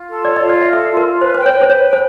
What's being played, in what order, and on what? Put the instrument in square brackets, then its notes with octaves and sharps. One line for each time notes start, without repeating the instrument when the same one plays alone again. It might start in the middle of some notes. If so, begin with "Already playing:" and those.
Already playing: [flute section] F4
A4
[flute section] C#5 [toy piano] D5
[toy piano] D#5
[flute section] F4
[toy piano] D5
[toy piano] E5 [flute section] F5
[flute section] A4 [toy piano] E5
[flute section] F4
[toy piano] A#4
[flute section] F4
[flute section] B4 [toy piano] C5
[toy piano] C5 [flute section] G5
[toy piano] C#5
[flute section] B4
[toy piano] C5
[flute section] B4 [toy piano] C#5
[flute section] G5
[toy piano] C5